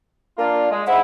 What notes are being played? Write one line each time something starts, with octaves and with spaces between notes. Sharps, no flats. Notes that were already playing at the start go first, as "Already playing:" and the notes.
A#3 D4 F4
G#3
G#2 E4 F#5